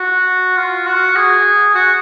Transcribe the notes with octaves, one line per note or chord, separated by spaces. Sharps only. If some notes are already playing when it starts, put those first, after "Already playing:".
Already playing: F#4
F4
F#4
G#4
F#4